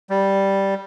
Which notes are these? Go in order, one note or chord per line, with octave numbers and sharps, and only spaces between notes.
G3